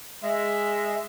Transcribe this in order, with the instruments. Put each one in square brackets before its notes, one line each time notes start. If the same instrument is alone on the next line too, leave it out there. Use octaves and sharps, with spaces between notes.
[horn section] G#3 E5